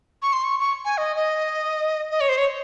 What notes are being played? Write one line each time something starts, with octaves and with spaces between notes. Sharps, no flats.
C#6
C6
C#6
C#6
G#5
D#5
D#5
D#5
C#5
C5
C#5